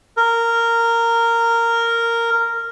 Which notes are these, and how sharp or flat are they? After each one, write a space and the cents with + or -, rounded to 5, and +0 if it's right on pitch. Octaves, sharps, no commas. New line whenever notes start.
A#4 -10